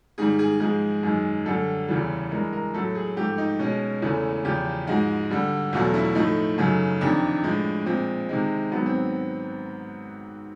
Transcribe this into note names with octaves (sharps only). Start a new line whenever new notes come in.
G#2 D#3 G3 G#4
G#4
G#2 F3 G#3 G#4
F#2 D#3 G#3
F#2 D3 G3 A4
E2 C#3 E3 G3
G2 E3 G#3 A#4
A#4
A2 F#3 A3 A4
G#4
G#2 F3 A3 G4
D#4
B2 G#3 C#4
E2 C#3 E3 A3
E2 C#3 F3 G4
G#2 F3 G#3 F#4
G2 D3 G3
E2 B2 F#3 A3 F4
E4
A2 F3 A3 D#4
F#2 C#3 F#3 A3
F2 C3 D#3 D4
A2 F3 G#3
A#2 F3 G#3 C4
C3 D#3 G#3
G#2 D#3 F#3 B3
C4